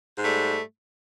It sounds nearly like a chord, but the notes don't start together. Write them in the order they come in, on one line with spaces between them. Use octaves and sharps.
G#2 A3 G3